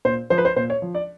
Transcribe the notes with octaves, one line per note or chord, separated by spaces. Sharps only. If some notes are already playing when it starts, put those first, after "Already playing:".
A#2 C5
F3 C5
B4
C5
A#2 C5
C#5
F3
D5